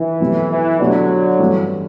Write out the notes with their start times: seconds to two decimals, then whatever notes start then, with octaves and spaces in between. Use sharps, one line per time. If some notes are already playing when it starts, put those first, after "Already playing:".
Already playing: E3
0.20 B2 F#3 A3 C4 G4
0.50 E3
0.79 B2 D3 F#3 A3 D4 G4 D5
1.39 G2 E3 A3 C4